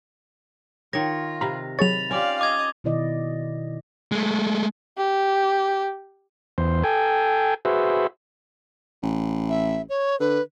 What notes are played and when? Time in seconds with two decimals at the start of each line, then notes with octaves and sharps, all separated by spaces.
0.93 D#3 F4 C#5 A#6
1.41 C3 F5 A#5 B5
1.79 F#3 G#4 C#5 B5 A6 F7
2.11 C#4 F4 G4 D5 F5
2.41 D#5 D6 G#6
2.84 B2 D#3 E4 D5 D#5
4.12 G#3 A3
4.97 G4
6.58 E2 C5
6.84 A4 G5 G#5
7.65 F#4 G#4 B4 C5 E5
9.03 A1
9.49 E5
9.89 C#5
10.20 D3 B4